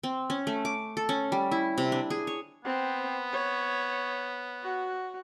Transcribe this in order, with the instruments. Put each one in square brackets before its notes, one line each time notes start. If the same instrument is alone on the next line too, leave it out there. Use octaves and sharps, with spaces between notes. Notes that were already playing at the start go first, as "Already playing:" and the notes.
[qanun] C4
C#4
A3
D6
A4
C#4
G3
E4
C3
D4
G#4
C#5
[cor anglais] B3 [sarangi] C4
[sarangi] C#5
F#4